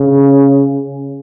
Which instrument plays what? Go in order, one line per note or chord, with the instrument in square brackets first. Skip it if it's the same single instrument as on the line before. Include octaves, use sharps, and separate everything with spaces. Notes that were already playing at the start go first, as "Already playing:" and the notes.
Already playing: [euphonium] C#3